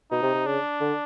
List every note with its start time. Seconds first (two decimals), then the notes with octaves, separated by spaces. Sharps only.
0.11 B2 D#4
0.23 C3
0.34 C3
0.46 C#3 D4
0.81 D3